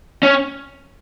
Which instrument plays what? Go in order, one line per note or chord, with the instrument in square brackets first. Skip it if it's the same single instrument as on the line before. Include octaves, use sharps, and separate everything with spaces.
[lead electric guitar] C#4